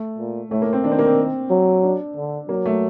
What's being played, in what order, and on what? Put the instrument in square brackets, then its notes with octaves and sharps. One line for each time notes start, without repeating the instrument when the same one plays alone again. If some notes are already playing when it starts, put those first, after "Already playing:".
Already playing: [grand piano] A3
[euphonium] A#2
[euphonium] A2 [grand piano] A3
[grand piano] A#3
C4
[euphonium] D#3 [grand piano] D4
[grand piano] C4
A#3
C4
[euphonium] F#3
[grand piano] D4
[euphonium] D3
[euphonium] F#3 [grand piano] A#3
[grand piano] A3